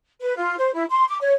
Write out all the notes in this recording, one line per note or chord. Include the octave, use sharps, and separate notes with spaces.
B4
F4
C5
E4
C6
D6
C#5